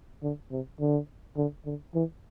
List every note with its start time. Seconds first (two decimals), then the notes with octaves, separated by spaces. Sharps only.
0.23 D3
0.51 C3
0.80 D3
1.37 D3
1.66 D3
1.95 E3